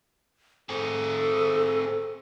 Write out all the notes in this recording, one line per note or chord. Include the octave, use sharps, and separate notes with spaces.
C4 G#4 A4